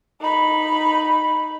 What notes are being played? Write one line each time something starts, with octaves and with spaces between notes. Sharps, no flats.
D#4 B5